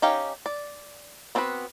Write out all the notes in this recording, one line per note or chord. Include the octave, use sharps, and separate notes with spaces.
C#4 D#4 G4 F5 G5
D5
B3 C4 D4 F#4 B4